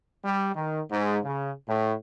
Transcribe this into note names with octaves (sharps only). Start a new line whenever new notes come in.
G3
D#3
G#2
C#3
A2